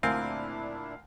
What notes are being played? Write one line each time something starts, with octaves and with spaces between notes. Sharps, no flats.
D2 A#2 C4 D4 E4 A#4 F5 G#5